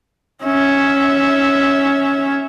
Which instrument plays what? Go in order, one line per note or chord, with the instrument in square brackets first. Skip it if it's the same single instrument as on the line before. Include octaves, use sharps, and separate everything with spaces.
[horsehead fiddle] C#4 E5